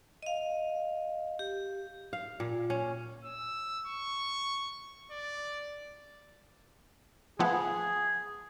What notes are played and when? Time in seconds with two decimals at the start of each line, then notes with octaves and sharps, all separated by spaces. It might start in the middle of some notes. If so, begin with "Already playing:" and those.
0.23 D#5 F5
1.39 G4
2.13 F5
2.40 A#2
2.70 C#4
3.25 E6
3.87 C#6
5.12 D5
7.39 F3 A3 B3 G#4